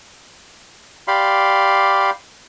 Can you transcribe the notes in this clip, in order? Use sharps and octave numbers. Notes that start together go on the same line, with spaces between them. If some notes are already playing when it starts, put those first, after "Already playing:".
G4 D5 F5 B5 C6